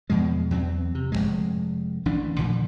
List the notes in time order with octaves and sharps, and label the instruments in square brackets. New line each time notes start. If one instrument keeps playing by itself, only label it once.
[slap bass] E2 B2 F3 G#3
E2 F#3 B3 C4
C3
F1 E2 G#3
A1 E3 D4
A#2 D3 F3